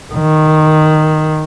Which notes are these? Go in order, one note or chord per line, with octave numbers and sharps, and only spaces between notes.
D#3